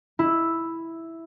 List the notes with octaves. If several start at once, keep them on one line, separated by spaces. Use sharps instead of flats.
E4